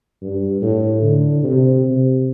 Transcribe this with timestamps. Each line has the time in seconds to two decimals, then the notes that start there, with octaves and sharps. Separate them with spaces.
0.22 G2
0.62 A2
1.02 D3
1.43 C3
1.84 C3